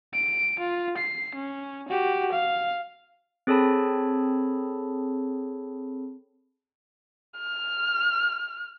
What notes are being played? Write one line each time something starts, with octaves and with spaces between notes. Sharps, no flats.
D7
F4
C7
C#4
F#4 G4
F5
C4 G#4 A4 C#5 A5 B5
F6